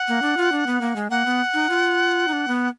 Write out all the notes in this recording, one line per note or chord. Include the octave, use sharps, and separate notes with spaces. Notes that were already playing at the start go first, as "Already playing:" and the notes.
Already playing: F#5
A#3
D4
F4
D4
B3
A#3
G#3
A#3 F#5
B3
D#4
F4
D#4
D4
B3